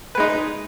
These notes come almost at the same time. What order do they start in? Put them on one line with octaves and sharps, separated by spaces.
B4 G#3 D#4